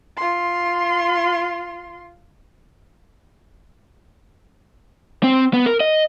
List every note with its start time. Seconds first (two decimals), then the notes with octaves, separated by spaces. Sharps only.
0.17 F4 C6
5.24 C4
5.53 B3
5.66 A#4
5.80 D#5